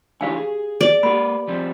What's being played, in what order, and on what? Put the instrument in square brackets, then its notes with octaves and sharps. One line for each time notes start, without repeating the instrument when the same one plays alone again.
[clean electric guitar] D3 E3 C#5 [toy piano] G4 F5 G#5
[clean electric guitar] G#4
[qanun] D5
[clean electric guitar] A#3 B4 [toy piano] G4 B5
[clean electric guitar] F3 G3 C4